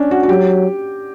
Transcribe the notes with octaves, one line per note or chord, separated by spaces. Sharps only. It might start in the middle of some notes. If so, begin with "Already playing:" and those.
Already playing: C#4 D4
F#4
F#4
F#3 G4